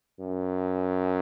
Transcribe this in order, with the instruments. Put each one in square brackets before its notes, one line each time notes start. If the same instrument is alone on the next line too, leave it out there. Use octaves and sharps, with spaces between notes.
[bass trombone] F#2